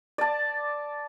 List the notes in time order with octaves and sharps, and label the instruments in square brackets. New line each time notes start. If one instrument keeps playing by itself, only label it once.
[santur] D5 A5